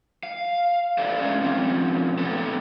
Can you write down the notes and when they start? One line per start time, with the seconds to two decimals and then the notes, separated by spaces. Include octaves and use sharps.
0.23 F5
0.98 A4 B4 D5 E5 F5
1.20 G#3 A3 C#4 D4 C#5 F5
1.41 B2 F3 C4 C#4
2.18 A3 B3 C4 A4 B4